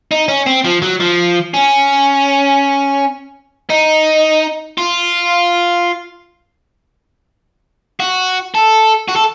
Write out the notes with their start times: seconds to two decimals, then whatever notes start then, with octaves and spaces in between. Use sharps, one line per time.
0.11 D#4
0.28 C#4
0.47 C4
0.65 F3
0.83 F#3
1.01 F3
1.54 C#4
3.70 D#4
4.78 F4
8.00 F#4
8.54 A4
9.08 F#4
9.16 A4